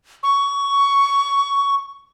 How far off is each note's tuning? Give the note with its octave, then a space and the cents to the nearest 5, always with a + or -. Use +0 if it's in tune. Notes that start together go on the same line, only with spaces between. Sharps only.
C#6 +15